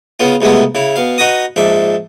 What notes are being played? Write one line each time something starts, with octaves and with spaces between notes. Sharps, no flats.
C#3 B3 F4
C#2 C3 G#3 A3 B3
C#3 E4
B2 F5
D#4 F#4 B4 A#5 D#6
A#1 G#2 D4 E5